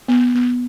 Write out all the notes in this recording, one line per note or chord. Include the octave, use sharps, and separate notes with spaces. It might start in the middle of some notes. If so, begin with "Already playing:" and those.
B3
B3